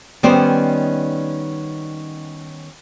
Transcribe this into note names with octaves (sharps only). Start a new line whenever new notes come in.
D#3 G3 B3 C#4 C5 D5